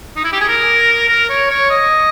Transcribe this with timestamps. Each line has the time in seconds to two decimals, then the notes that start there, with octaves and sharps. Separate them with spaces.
0.16 D#4
0.24 E4
0.32 G4
0.40 G#4
0.48 A#4
1.08 A#4
1.29 C#5
1.50 C#5
1.70 D#5